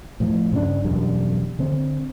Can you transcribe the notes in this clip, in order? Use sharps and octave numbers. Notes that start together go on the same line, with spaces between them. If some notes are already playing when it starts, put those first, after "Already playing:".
A2 F3
G2 C#3 A#3 D4
E1 F#2 G3 D4
D3 C4